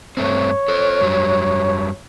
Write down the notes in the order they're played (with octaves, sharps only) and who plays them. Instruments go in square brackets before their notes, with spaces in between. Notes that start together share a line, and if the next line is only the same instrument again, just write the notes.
[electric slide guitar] G2 A3 C4 [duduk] C#5
[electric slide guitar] A4 C5
F#2 F#3 G3